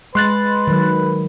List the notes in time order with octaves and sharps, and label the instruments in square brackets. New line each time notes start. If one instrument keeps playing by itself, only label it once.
[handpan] G#3 [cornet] B4 [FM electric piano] C6 F#6 A6
[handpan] D#3 F#3